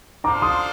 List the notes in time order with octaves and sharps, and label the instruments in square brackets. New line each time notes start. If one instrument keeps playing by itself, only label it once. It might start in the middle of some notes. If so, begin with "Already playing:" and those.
[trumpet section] D4 F4 A4 C5 F5 [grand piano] A#5 D6
[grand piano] C6 D#6